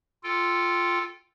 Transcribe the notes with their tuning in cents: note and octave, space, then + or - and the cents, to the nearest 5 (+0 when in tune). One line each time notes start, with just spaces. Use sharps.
F4 +0 A4 +0 G5 +0